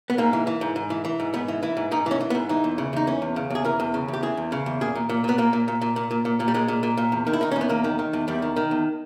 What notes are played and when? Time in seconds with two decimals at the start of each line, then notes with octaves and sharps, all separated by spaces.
0.10 B3
0.18 G#2 A#3
0.33 E3
0.47 E3
0.61 G#2
0.76 G#2
0.90 E3
1.05 E3
1.20 G#2
1.34 G#2 B3
1.48 E3
1.63 E3 E4
1.77 G#2
1.91 G#2 D#4
2.06 E3 C#4
2.21 E3
2.30 B3
2.35 G#2
2.49 E3 D#4
2.64 E2
2.78 C#3
2.93 E2 D#4
3.07 E3 C#4
3.22 E2
3.36 C#3
3.50 E2 G#4
3.65 E3 A#4
3.80 E2
3.94 C#3
4.08 E2
4.13 G4
4.23 E3 G#4
4.37 E2
4.52 C#3
4.66 E2
4.81 A#2 G#4
4.95 A#2
5.09 A#2
5.24 A#2 B3
5.38 A#2 A#3
5.53 A#2
5.68 A#2
5.82 A#2
5.96 A#2
6.11 A#2
6.25 A#2
6.40 A#2
6.48 G3
6.54 A#2 G#3
6.68 A#2
6.83 A#2
6.97 A#2
7.12 E2
7.27 D#3
7.33 E4
7.41 D#3 D#4
7.51 C#4
7.56 E2
7.61 B3
7.69 E2 A#3
7.84 D#3
7.99 D#3
8.13 E2
8.28 E2 G3
8.42 D#3
8.56 D#3
8.71 E2